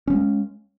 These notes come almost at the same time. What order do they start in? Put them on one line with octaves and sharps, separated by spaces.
C#4 A#3 G#3